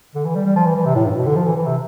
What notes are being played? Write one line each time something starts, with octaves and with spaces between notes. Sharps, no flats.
D3
E3
G3
G3
F3
E3
E3
C3
A2
G2
A2
B2
D3
F3
E3
E3
C3